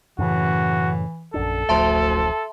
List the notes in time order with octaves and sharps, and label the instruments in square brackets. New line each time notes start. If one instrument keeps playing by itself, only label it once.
[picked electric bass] F#2 A2 C#3 [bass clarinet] E3 [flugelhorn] F#4
[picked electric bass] A#1 F#2 D4 [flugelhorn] A4
[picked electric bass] D1 A1 F3 [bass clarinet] D2 [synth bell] E5 A5 C6